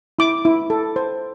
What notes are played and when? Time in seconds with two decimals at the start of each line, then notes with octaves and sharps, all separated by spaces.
0.19 E4 D6
0.45 E4
0.70 A4
0.96 C5